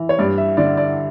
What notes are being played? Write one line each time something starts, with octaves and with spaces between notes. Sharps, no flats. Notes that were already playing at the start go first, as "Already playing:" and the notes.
Already playing: E3
C#5
G2 D5
E5
D3 D5
D5